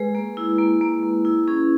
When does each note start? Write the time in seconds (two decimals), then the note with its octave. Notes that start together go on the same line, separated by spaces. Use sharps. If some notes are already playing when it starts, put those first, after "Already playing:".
Already playing: G#3 G#4 B4
0.15 A#3
0.37 E4
0.59 A#3
0.81 A#3
1.03 A#3
1.25 E4
1.48 C#4 G#4